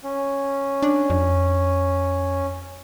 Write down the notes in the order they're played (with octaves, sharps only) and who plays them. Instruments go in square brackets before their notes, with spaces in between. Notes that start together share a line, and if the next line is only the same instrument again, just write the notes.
[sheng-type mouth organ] C#4
[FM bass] D4
F2